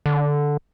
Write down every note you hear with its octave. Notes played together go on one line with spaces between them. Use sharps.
D3